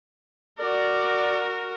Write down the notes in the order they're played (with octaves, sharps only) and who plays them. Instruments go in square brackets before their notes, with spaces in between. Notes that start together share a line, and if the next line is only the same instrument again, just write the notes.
[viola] F#4 A#4 [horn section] D5